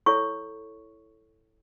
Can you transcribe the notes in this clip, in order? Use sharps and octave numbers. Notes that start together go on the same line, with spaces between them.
E4 A4 C#5 C#6